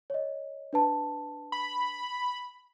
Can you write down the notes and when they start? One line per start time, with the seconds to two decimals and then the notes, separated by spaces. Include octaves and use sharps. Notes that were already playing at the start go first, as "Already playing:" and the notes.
0.10 C#5 D#5
0.73 D4 B4 A5
1.52 B5